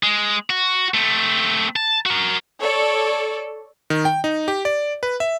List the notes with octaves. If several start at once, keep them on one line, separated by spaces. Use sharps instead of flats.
G#3
F#4
A3 C4
A5
F#4 A#4
A4 C#5 D5
D#3
G5
D#4
G4
D5
B4
E5